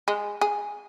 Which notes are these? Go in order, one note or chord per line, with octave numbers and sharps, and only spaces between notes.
G#3
G#4